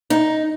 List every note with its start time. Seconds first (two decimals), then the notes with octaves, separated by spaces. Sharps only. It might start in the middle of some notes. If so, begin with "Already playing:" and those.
0.10 D#4